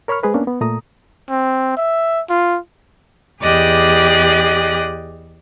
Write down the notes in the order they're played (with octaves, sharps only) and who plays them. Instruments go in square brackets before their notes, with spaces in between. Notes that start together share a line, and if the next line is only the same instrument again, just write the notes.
[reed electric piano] A#4 C#5 B5 C#6 F6
G#3 G#4 B4 C5
A#3 B3 C#4 D4
B3
A#2 A3 A#5 D#6
[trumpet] C4
E5
F4
[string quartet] E2 G4 G#4 D5 D#5 F#6